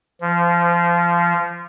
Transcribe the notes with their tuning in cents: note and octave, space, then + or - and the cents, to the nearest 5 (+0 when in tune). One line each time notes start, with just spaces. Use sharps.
F3 -20